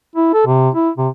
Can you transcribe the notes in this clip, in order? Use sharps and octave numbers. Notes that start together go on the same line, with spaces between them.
E4
A4
C3
E4
C3